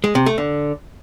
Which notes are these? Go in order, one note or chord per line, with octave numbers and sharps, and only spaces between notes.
G#3
C3
A3
D3